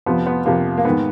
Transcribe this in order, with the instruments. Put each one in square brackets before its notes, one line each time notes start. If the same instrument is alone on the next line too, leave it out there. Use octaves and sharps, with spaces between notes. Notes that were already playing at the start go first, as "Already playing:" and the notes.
[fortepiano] F2 C3 F3 B3
B3
F2 C3 F3 A#3
A#3
G#2 D#3 B3